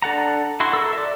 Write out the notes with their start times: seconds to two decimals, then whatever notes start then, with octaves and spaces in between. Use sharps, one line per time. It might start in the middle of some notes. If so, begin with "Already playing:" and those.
0.02 D4 A4 F#5 A#5
0.60 E4 F#4 C6
0.73 A4 A#4 E6
0.93 D5 E5